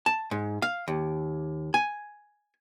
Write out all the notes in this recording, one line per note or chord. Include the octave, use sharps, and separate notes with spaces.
A5
G#2
F5
D#2
G#5